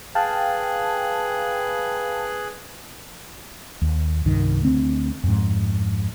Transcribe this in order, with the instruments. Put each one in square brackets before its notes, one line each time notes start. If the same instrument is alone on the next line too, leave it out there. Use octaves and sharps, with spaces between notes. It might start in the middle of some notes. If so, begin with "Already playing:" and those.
[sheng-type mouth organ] G#4 F#6 [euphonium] B4 [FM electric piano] F5 G5 A5
[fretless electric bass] D#2
C2 G2 D#3
D2 C4
F2 G#2